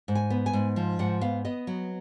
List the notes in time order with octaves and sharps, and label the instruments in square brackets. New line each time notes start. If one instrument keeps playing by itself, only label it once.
[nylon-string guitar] G#2
G#5
B3
G#5
G#2
F3
G#2 F#5
B3 F5
B3 D#5
F#3